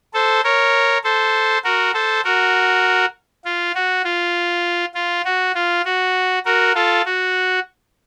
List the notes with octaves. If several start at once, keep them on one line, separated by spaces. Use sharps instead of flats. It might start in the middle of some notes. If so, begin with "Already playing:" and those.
A4 C5
A#4 C#5
A4 C5
F#4 A#4
A4 C5
F#4 A#4
F4
F#4
F4
F4
F#4
F4
F#4
F#4 A#4
F4 A4
F#4